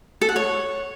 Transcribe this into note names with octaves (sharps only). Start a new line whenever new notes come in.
A4
F#5
C#5